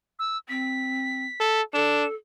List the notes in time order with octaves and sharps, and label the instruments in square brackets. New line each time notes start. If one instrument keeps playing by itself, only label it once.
[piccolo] E6
[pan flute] C4 [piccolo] B6
[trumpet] A4
[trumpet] D4 [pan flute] A4 [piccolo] E7